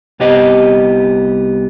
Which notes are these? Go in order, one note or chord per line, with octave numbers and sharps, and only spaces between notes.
C2 B3 G4 D#5